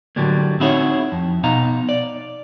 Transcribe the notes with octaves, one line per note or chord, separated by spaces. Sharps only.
A2 D3 F#3 G3 A#3
C4 D#4 E4 F#4 G#4 C#5
F2
B2 D#4 F5 A#5
D5